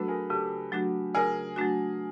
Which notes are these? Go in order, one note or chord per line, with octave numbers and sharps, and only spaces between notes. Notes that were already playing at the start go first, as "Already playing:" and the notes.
Already playing: F#3 A3 D4 F#4 A4 B4
G#4 A#4
C#3 G4 A4
F#3 A3 D4 F#4
C#3 G#4 A#4
F#3 A3 D4 F#4